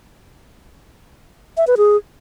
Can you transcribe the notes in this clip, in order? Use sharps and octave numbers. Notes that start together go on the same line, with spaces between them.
E5
B4
G#4